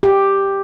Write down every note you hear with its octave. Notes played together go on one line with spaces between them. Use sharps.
G4